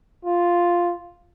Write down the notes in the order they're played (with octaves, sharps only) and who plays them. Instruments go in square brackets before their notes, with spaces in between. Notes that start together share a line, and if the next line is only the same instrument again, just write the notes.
[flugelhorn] F4